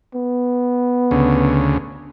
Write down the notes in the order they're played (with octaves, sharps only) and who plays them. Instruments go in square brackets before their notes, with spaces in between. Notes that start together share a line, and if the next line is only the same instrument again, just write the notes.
[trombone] B3
[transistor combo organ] D2 C#3